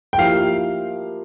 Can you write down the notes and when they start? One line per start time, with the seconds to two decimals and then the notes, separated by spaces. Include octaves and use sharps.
0.13 G5
0.18 F3 A#3 E4 G4 A#4 F5